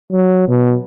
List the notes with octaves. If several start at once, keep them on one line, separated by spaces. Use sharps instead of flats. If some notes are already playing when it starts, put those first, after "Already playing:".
F#3
B2